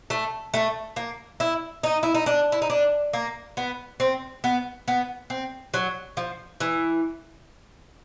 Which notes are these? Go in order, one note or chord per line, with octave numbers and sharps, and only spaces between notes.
A3
A3
A#3
E4
D#4
E4
D#4
D4
E4
D#4
D4
A#3
B3
C4
B3
B3
C4
F#3
F3
E3